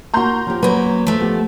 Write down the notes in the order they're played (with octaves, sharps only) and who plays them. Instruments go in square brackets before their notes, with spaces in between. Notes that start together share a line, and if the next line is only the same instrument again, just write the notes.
[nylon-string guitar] A#3 F#4 [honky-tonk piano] A#5 C6 G6
[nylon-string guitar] F3 G4
[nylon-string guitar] F#2 F#3 B4 [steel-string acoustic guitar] A#3 B3
[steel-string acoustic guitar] F3 A3
[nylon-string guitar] B3 G4